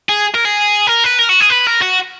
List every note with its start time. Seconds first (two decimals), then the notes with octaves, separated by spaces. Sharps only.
0.09 G#4
0.35 A#4
0.45 G#4
0.87 A#4
1.04 B4
1.19 A#4
1.29 F#4
1.40 G#4
1.50 B4
1.67 A#4
1.81 F#4